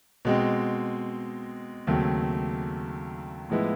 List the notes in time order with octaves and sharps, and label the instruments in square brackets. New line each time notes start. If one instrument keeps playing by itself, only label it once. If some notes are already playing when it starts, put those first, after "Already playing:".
[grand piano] B2 G#3 C4
D#2 C#3 F#3 A3 C4
A2 F3 G#3 B3 E4